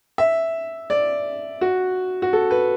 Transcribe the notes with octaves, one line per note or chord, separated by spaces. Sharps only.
E5
D5
F#4
F#4
A4
B4